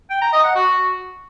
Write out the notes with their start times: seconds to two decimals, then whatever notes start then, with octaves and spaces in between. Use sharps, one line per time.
0.10 G5
0.22 A#5
0.33 D#5
0.44 F#5
0.55 F#4